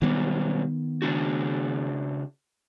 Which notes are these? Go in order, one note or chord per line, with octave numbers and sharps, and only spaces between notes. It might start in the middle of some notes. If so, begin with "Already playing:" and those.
B2 D#3 F#3 G3 B3
C#3 D4 F#4